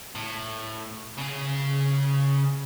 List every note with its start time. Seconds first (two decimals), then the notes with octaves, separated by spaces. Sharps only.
0.15 A2
1.18 C#3 G#4